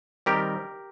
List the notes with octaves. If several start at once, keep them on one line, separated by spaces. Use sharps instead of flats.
D#3 G3 C4 G4 A#4